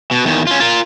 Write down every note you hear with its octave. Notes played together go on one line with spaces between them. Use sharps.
B2
E2 D#3
C#4 F4
F4 A#4